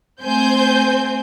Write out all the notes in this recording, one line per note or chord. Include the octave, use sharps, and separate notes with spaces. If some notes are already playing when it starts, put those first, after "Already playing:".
A3 C4 C5 G#5 G6